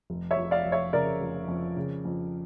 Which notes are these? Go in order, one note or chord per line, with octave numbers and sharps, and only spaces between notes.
F1
C#5 E5
F1
D5 F5
F1
C#5 E5
C#3 A#4 D5
F1
F2
C#3
F2